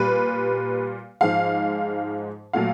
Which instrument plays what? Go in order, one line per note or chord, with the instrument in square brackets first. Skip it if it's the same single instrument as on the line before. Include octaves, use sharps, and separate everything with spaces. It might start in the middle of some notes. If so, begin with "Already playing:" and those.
Already playing: [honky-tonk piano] A#2 G3 B4
G#2 F3 G#3 F5
A#2 F#3 A3 F5